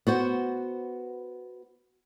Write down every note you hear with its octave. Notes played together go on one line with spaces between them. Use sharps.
B3 F#4 C5